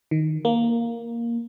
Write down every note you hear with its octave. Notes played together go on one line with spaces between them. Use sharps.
D#3
A#3